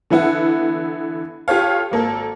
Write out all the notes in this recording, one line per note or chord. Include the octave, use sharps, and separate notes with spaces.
D3 E3 B3 E4 F#5
F4 G4 A4 C#5 F5
G#1 A#3 A4